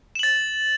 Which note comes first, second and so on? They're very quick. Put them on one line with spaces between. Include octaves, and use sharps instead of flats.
E7 F#7 A6